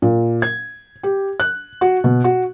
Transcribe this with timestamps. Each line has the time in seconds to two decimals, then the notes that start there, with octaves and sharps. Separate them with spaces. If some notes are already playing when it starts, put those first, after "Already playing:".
0.02 A#2
0.42 G#6
1.03 G4
1.40 F#6
1.81 F#4
2.04 B2
2.24 F#4